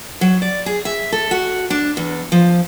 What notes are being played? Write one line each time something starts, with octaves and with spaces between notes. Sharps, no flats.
F#3
D5
G#4
E5
A4
F#4
D4
E2
F3